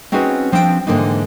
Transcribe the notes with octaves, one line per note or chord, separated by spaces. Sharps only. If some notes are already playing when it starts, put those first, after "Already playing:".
C4 C#4 D#4 F#4 G#4 B4
F3 C4 D4 E4 G5
G#2 D3 E3 G#3 A#3 D#4